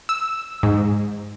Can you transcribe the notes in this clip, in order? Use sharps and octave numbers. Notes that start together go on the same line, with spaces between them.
E6
G#2